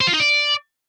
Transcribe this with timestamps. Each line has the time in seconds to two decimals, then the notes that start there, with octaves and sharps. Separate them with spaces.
0.01 C5
0.07 F4
0.13 D#4
0.20 D5